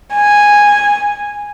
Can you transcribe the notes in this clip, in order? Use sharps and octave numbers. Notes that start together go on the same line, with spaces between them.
G#5